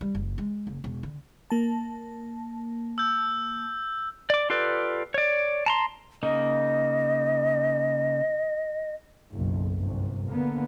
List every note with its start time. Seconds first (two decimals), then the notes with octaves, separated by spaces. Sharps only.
0.01 G3
0.15 F#1
0.38 G#3
0.67 F#1
0.84 E1
1.03 D3
1.50 A#3 A5
2.98 E6 G6
4.30 D5 D6
4.50 F4 G4 A4 B4 D5
5.14 C#5 D5
5.66 A5 A#5 C6
6.23 C#3 A#3 D#4 D#5
9.33 F#1 B1
9.78 G1 C2
10.28 D3 A#3 B3